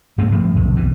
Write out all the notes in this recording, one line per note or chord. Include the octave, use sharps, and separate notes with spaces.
G2 A3 A#3 C4
A2 F3
B1 F2 C3
B1 B2 E3